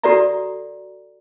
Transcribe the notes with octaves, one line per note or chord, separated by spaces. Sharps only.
F#4 A4 B4 D5 E5 A#5